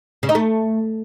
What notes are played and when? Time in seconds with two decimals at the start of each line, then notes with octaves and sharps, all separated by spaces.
0.23 C#3
0.29 D#4
0.35 A3